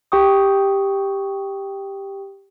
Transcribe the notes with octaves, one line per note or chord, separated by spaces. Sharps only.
G4 G5 C#6 D#6